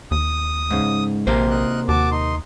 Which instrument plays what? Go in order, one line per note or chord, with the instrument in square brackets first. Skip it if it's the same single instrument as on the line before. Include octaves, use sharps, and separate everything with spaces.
[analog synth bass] D#2 [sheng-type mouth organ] D#6
[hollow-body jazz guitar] G#2 C#3
[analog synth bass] A#1 [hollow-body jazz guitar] C3 A#3 C5 [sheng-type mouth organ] A#4
[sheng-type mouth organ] D#4 A#4 F#6
[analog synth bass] D#2 [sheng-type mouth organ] F#4 A5 D6
[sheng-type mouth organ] D#4 C6